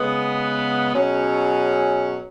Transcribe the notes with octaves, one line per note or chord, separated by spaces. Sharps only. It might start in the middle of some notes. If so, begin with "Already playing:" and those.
Already playing: C#3 G#3 B3
B2 F#3 C#4 G#4